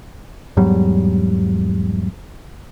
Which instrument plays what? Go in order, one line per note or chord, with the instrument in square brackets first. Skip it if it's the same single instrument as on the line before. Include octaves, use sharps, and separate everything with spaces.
[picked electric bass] E2 G#2 F#3 G3